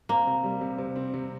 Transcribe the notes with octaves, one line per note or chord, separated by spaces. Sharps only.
A#3 C4
C3
G3
C3
C3
C4
C3